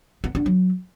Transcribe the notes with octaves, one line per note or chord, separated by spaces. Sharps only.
B3
D4
F#3